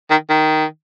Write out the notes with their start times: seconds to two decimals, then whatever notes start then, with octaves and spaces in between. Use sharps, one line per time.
0.10 D#3
0.30 D#3